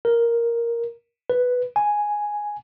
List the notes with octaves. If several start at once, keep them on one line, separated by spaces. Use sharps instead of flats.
A#4
B4
G#5